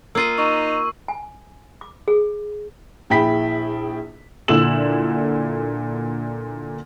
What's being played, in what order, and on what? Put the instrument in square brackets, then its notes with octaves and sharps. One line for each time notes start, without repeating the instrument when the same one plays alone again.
[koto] A#3 F4 D#5 [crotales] E6 D#7
[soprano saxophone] D#4 [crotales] C#6 D#7
[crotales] C7
[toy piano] G#5
D6
G#4
[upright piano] A#1 E4 G#4 G5 B5 B6
[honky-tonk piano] A#2 D3 E4 E6 E7 F#7